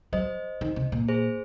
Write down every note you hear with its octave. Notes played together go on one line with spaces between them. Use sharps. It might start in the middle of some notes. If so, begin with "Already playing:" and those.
F#3 C5 D#5
D#3
C3
A#2
G#4 C5